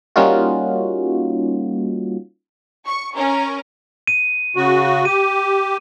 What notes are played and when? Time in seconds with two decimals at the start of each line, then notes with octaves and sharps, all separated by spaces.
0.16 G3 A#3 C#4 D#4 F4 F#4
2.86 C#6
3.15 C#4 A#4
4.07 D#7
4.56 C#3 F#4
5.05 G4 D#7